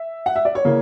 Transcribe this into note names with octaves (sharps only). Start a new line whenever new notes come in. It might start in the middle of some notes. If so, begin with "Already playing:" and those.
Already playing: E5
F#5
E5
D5
C#5
C#3 E3 A#3